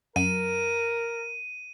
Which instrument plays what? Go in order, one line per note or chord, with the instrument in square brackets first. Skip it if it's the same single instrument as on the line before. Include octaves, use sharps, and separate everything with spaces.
[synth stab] F#2 [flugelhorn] A#4 [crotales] D#7